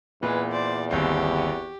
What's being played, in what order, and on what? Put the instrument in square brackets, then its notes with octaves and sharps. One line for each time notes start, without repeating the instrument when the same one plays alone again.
[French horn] E2 [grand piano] A#2 [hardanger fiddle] G#3 [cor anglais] B4
[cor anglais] C5 [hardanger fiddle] D5
[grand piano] G1 D#2 C4 [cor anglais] F#4 [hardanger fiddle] G4